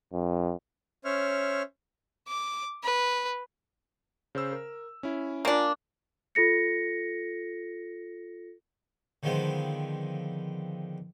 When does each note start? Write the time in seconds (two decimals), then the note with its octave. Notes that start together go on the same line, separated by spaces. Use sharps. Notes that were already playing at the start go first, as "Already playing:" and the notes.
0.13 F2
1.05 C#4 C5 C#5 E5 F6
2.28 D6
2.83 B4
4.35 C#3 C5 E6
4.53 A#4
5.03 C#4 E4
5.45 A#3 D4 F4 G#5 A#5
6.35 F4 A4 A#6 C#7
9.23 D3 D#3 F3 G#3 B3 C4